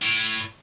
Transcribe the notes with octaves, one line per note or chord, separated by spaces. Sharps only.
A2